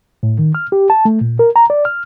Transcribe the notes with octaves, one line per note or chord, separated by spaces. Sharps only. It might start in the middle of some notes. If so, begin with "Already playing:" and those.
A2
D#3
F6
G4
A5
A3
A#2
A#4
A#5
D5
F6